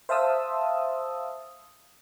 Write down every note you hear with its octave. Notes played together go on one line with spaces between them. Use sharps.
C5 E5 F5 A5 D#6 E6